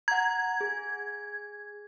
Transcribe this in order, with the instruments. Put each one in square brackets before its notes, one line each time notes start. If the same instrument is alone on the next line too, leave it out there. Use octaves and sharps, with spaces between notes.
[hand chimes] F#5 A#5 [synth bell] G#6
[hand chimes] G#4